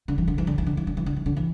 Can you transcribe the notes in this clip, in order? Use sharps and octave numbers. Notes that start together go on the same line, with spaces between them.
D3
E3
D3
E3
D3
E3
D3
E3
D3
E3
D3
E3
D3
E3